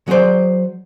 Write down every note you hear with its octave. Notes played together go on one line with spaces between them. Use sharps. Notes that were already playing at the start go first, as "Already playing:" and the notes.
F#3 G#4 A#4 C5 D5